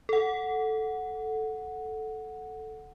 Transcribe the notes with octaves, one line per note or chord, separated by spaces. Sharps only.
A4 F#5